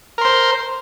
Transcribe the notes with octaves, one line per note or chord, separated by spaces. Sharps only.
A#4 C5 C6